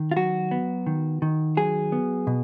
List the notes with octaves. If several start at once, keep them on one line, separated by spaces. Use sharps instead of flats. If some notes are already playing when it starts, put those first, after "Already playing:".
Already playing: D#3
F4
F#3 F#4
B3
D#3
D#3
F#3 G#4
B3
B2